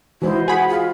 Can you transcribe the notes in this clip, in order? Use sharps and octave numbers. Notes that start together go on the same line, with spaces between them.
E3 G#3 D#4 E4 F#4 C5 D#5
F#4 G#4 F#5 B5
F4